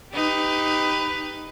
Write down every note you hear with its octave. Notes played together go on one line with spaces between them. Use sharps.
D#4 G4 B4